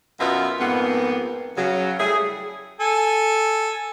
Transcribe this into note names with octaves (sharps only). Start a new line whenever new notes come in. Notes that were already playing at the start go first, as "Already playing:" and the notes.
F#2 B2 B3 F4 D#5 E5
F2 G#2 A#3 B3
C#3 F#3
G3 A3 E4 G#4
A4 G#5